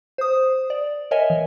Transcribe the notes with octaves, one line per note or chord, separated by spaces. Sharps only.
C5 D#6
D5
A#4 C#5 D#5 E5 G#5
E3